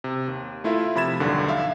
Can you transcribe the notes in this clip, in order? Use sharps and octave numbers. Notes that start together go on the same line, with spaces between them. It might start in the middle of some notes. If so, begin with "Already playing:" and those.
C3
D#2
A3 E4 F4 A#4 E5
C3 F3 B5 G#6 A6 E7
B1 E2 G2 D3 D#3
E5 F5